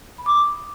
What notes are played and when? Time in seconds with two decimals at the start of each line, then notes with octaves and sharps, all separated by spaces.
0.18 B5
0.26 D6
0.34 D#6